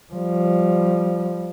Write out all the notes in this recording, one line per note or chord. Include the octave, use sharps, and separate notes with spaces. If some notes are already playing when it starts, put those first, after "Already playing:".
F3 G3